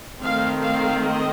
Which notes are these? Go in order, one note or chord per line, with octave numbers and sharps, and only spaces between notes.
D#3 A3 C4 F5
F5
D#5